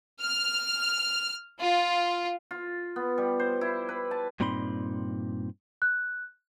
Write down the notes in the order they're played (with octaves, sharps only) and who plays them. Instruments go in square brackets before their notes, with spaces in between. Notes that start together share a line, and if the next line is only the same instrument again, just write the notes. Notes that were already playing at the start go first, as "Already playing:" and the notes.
[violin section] F6
F4
[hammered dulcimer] F4
B3
G3
C5
E4
B4
A5
[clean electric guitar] G2 A#2 C4 D#4 B5 C6
[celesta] F#6